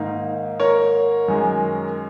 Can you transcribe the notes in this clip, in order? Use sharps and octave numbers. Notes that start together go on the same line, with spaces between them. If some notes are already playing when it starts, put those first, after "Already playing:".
Already playing: G#2 D#3 A#3 D#4
A#4 C#5
F#2 D#3 G#3